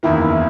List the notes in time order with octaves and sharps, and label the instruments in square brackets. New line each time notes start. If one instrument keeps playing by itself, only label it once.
[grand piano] F#1 E2 D#3 A#3 [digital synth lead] E4